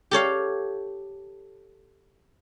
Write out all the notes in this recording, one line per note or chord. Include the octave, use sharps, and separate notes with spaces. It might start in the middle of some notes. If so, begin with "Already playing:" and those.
G4 A4 C#5 F5